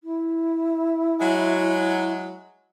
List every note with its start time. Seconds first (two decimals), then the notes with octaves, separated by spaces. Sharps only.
0.03 E4
1.20 F#3 G#3